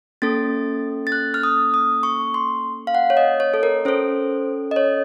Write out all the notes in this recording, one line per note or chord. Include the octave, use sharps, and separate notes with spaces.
A#3 C#4 A4 A6
A6
F#6
F6
D#6
D#6
C#6
C6
F5
F#5
C#5
D#5
C#5
A4
A#4
C#4 A4 C5
D#5
C#5